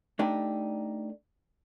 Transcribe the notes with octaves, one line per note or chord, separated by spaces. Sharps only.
A3 D4 D#4 G4